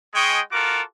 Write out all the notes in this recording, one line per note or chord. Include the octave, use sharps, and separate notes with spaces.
G#3 G#4 D#5 G5 C#6
F4 F#4 A4 A#4 D6